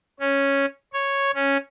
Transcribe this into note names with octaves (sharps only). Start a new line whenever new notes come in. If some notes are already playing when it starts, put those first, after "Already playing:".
C#4
C#5
C#4